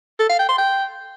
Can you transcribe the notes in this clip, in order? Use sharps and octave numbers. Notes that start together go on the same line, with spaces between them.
A4
F5
G5
C6
G5